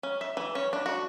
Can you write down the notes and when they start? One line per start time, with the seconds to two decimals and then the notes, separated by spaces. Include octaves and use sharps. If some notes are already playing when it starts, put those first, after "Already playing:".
0.03 C#4
0.21 E5
0.37 E3
0.55 C#4
0.73 D4
0.86 F#4